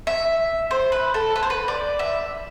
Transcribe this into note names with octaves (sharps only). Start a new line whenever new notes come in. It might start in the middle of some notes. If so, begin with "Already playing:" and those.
E5
C5
B4
A4
B4
C5
B4
D5
E5